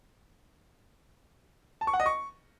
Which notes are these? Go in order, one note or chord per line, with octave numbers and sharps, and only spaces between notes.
A5
C#6
F#5
D#5
C#6